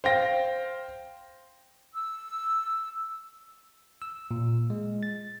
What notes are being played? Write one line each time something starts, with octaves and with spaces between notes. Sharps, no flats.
C5 F5 G5 A#6
E6
E6
A#2
G#3
A6